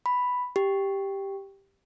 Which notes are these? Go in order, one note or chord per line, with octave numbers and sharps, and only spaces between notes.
B5
G4